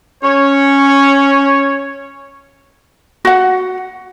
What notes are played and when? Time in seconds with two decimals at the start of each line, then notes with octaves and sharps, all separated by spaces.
0.23 C#4 C#5
3.25 F#4 F#5